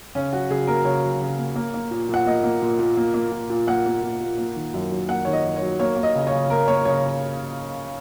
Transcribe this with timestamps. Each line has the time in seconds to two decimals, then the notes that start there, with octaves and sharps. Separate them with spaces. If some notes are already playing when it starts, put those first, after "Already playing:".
0.15 C#3 C#4
0.33 F#3 F#4
0.50 C#3 G#4
0.67 A#3 A#4
0.85 C#3 C#5
1.03 F#3
1.21 C#3
1.38 A#3
1.56 A#3
1.74 A#3
1.91 A#2
2.09 A#2 F#5
2.26 A#3 D#5
2.44 A#3
2.62 A#2
2.79 A#2
2.97 A#3
3.14 A#3
3.32 A#2
3.50 A#2
3.67 A#3 F#5
3.86 A#3
4.03 A#2
4.20 A#2
4.38 A#3
4.56 D#3
4.74 F#2
4.91 F#3
5.09 A#3 F#5
5.25 D#3 C#5
5.33 D#5
5.44 F#2
5.56 C#5
5.62 F#3
5.79 A#3 C#5
5.96 A#3
6.03 D#5
6.15 C#3
6.27 C#3 C#5
6.50 A#3 A#4
6.67 A#3 C#5
6.85 C#3 C#5